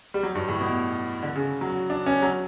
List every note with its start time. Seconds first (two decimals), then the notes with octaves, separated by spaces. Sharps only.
0.14 G3
0.23 F#3
0.35 G2
0.48 A2
0.61 B2
1.23 D3
1.36 C#3
1.61 F#3
1.90 D4
2.06 C#4
2.22 F#3